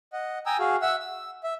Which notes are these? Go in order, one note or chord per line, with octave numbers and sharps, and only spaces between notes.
D#5 F#5
G5 G#5 A#5 D#6 E6
F#4 G#4 F5
E5 F#5 E6
E6
E5